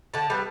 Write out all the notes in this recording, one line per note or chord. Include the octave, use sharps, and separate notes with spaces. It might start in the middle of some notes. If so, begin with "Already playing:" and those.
D3 A5
G3 B3